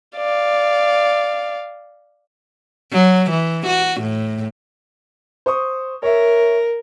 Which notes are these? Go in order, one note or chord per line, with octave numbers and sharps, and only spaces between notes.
D5 F5
F#3
E3
F#4
A2
C5 C#6 D#6
A#4 C#5 E5